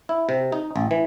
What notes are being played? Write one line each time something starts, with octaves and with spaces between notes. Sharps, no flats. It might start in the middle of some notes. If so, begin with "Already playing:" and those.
E4
C3
D#4
A1
E3